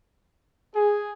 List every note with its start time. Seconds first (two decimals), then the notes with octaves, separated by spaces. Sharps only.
0.76 G#4